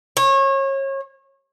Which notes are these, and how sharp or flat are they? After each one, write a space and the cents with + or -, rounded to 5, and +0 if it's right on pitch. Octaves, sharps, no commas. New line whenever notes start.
C#5 -30